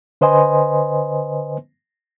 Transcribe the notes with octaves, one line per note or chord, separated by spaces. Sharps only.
D3 B4 C5 D#5 G#5 C6